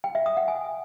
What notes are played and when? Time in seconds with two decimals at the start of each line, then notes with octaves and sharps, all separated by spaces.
0.04 G5
0.15 E5
0.26 D#6
0.37 F#5
0.48 G#5